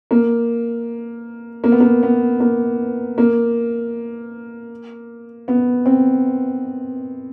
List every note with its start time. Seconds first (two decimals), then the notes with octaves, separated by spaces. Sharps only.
0.11 A#3
1.64 A#3
1.72 B3
1.81 A#3
2.03 B3
2.40 A#3
3.18 A#3
5.48 B3
5.86 C4